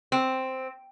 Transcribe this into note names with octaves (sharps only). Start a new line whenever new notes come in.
C4